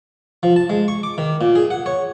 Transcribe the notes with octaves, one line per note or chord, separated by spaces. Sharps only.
F3
A5
G#3
C#6
D6
D#3
A#2
G#4
F#5
C#5